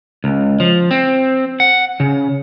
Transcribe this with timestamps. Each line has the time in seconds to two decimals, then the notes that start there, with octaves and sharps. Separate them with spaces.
0.24 C#2
0.60 F3
0.91 C4
1.60 F#5
2.00 C#3